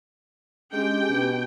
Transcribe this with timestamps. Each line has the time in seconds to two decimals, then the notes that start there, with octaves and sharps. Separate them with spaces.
0.73 G#3 C#4 D4 G4 G5
1.10 B2